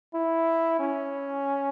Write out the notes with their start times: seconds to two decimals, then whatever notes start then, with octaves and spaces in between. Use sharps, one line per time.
0.14 E4
0.80 C#4